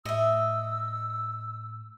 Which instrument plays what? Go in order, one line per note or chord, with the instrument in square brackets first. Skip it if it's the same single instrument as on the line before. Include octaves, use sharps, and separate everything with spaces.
[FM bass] A2 [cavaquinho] D#5 E5 [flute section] E6